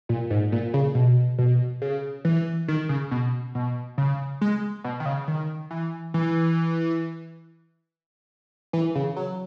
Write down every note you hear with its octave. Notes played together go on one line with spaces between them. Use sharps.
A#2
G#2
A#2
C#3
B2
B2
C#3
E3
D#3
C#3
B2
B2
C#3
G#3
B2
D#3
C#3
D#3
E3
E3
E3
C#3
F#3